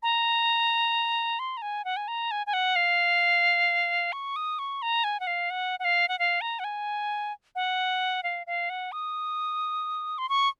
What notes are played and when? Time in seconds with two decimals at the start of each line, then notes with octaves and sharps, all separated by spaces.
0.03 A#5
1.39 C6
1.57 A#5
1.62 G#5
1.85 F#5
1.97 G#5
2.08 A#5
2.31 G#5
2.47 G#5
2.53 F#5
2.76 F5
4.13 C#6
4.36 D#6
4.59 C#6
4.82 A#5
5.04 G#5
5.20 F#5
5.27 F5
5.50 F#5
5.80 F#5
5.84 F5
6.08 F#5
6.19 F5
6.41 A#5
6.59 F#5
6.64 G#5
7.55 F#5
8.23 F5
8.47 F5
8.70 F#5
8.92 D#6
10.18 C6
10.29 C#6